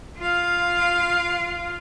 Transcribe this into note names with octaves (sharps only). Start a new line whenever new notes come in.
F4 F5